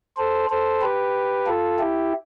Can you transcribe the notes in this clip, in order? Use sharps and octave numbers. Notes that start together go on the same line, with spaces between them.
A4 C5
A4 C5
G4 B4
F4 A4
E4 G4